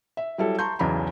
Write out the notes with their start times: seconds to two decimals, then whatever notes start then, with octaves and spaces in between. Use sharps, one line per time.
0.17 E5
0.38 F#3 G3 E4 A4
0.59 A5 A#5 C6 C#6 G6
0.79 B1 E2 C#3 A#5 B5